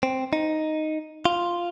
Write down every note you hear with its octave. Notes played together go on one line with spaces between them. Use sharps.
C4
D#4
F4